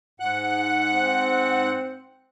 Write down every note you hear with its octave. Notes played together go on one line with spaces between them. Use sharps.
G#2 F#5 F#6
C4